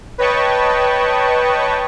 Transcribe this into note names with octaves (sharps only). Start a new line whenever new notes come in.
B4 C#5 D#5 G5 A5 C#6